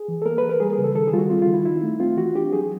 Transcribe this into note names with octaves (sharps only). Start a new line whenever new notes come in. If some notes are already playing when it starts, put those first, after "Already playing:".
Already playing: G#4
E3
A4
A#3 A#4
E3 B4
A#4
G3 G#4
G#4
C#3
A4
D#3 A4
G#4
G3 F4 F#4
C4 F4
F4
D#3
E4
D#4 E4
A3
C4 F4
E3 F#4
D4 G4
F#3 G#4